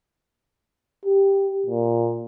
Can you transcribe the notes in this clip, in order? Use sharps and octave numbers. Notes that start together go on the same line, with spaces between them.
G4
A#2